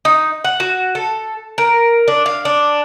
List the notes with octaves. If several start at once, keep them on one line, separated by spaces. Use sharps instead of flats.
D#4
F#5
F#4
A4
A#4
D4
F5
D4